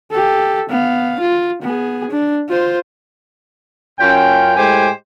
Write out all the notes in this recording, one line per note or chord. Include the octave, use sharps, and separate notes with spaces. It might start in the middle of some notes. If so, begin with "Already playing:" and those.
G4 A4
B3 F5
F4
B3 G#4
D4
F4 C5
F#2 C#4 F4 G5
A2 G#3 G4 C5 G#5